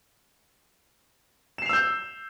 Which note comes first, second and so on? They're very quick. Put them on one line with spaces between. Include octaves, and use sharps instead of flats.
E7 C7 F7 E6 G6